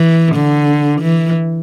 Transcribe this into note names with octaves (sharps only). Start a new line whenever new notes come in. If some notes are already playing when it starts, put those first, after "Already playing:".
Already playing: E3
D3
E3